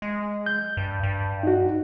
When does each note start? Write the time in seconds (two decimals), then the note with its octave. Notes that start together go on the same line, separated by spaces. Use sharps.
0.02 G#3
0.46 G6
0.77 G2
1.03 G2
1.43 D#4 F#4